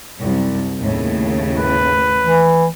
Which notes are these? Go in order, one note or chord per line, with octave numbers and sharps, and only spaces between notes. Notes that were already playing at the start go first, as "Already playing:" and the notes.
C2 F#2
D#2 A2 C#3
B4
E3